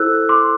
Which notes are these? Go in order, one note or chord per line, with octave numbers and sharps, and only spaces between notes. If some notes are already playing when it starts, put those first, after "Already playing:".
Already playing: E4 A4 C5 E6 F#6
C6 D6